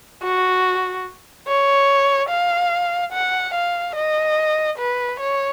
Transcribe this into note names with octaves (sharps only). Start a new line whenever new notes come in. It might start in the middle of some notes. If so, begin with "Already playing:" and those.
F#4
C#5
F5
F#5
F5
D#5
B4
C#5